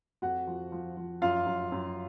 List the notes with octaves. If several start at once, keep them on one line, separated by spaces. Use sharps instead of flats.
F2 F#4 F#5
F3
F3
F3
F#2 F4 F5
F#2
F#2